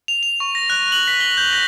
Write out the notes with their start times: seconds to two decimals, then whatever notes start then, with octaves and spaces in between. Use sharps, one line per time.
0.08 F7
0.23 F7
0.40 C#6
0.55 A#6
0.70 F#6
0.92 F#7
1.08 B6
1.20 G7
1.37 G6
1.53 A#6